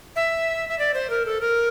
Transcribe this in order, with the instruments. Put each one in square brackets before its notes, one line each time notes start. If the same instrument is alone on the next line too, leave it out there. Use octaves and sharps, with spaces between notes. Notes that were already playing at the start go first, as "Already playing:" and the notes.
[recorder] E5
E5
D5
C5
A#4
A4
A#4